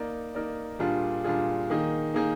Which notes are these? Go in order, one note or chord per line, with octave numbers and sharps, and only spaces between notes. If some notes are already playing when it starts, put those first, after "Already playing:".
Already playing: A#3 D#4 A#4 D5
A#3 D#4 A#4 D5
A#2 G3 D4 F4 G#4
A#2 G3 D4 F4 G#4
D#3 A#3 D#4 G#4
D#3 A#3 D#4 G#4